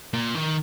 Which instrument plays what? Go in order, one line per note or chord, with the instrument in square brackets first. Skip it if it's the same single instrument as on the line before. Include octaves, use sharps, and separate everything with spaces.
[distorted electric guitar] A#2
D#3